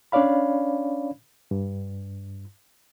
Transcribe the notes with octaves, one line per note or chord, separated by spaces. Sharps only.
C#4 D4 C#5 D5 F5 B5
G2